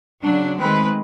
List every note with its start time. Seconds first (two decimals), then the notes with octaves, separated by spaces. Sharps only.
0.24 C#3 F#3 D4
0.59 D#3 G#3 A3 C4 B4